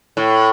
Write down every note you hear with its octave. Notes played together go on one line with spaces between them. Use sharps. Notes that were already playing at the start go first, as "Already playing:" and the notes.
A2